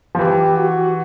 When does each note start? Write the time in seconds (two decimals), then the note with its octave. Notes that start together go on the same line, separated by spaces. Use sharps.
0.15 F3
0.19 E3 G4
0.57 F#4